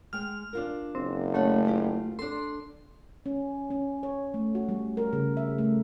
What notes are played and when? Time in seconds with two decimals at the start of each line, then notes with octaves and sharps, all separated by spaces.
0.13 G#3 G5 F6
0.53 D4 F4 A#4
0.95 F#1 C4
1.34 D2 A3 C#4 F#5
1.65 F4 G4
2.19 D4 A4 C6
3.26 C#4
3.70 C#4
4.03 C#5
4.34 A3
4.55 F#4
4.69 G3
4.97 A#4
5.13 C#3
5.37 E5
5.58 A3